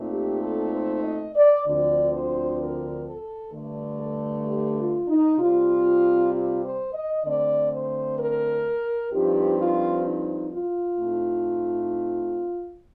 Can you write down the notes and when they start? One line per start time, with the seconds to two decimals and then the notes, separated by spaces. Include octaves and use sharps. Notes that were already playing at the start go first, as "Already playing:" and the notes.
Already playing: A#2 A3 C4 D#4
0.09 G4
0.41 A4
0.72 C5
1.03 D#5
1.35 D5
1.65 D2 D3 F3 C4 D5
2.12 C5
2.59 A#4
3.05 A4
3.52 G2 D3 A3
3.98 A4
4.45 G4
4.76 F4
5.07 D#4
5.38 C3 G3 C4 F4
6.32 F4
6.63 C5
6.93 D#5
7.24 D3 A3 C4 D5
7.72 C5
8.18 A#4
9.12 G2 F3 C4 D#4 G4
9.58 F4
10.04 D#4
10.51 F4
10.98 A2 A3 C4 D#4